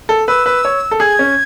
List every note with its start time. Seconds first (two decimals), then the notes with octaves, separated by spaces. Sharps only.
0.09 A4
0.28 B4 E6
0.46 B4
0.65 C#5
0.91 A4
1.00 G#4 G#6
1.19 C#4